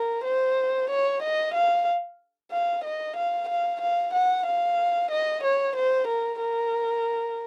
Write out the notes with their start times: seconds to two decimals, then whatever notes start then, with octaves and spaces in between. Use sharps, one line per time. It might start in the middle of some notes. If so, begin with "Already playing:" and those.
Already playing: A#4
0.25 C5
0.90 C#5
1.22 D#5
1.54 F5
2.51 F5
2.84 D#5
3.17 F5
3.49 F5
3.81 F5
4.14 F#5
4.46 F5
5.11 D#5
5.43 C#5
5.76 C5
6.07 A#4
6.41 A#4